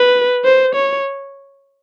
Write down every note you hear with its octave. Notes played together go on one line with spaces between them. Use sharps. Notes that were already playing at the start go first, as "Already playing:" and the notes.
Already playing: B4
C5
C#5